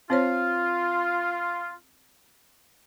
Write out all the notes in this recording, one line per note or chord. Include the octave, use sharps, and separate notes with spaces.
C4 F4 C5 C#5